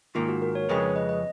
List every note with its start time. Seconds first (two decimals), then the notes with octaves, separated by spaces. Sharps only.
0.15 G#2 D#3 A#3 F4
0.29 F#4
0.42 A#4
0.55 C#5
0.69 F2 C#3 G#3 C#4 B4
0.83 B4
0.96 D#5
1.09 D#5